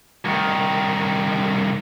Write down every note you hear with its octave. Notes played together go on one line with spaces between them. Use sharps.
C2 D#3